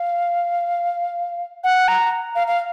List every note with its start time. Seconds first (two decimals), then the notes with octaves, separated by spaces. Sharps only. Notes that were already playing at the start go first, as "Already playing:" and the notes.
Already playing: F5
1.64 F#5
1.88 A#5
2.35 F5
2.47 F5